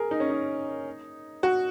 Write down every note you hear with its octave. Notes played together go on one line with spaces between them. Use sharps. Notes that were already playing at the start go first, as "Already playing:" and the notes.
Already playing: G#4 A#4
D#4
C#4
D#4
F#4